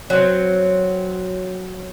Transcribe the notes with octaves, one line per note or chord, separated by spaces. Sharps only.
F#3 C4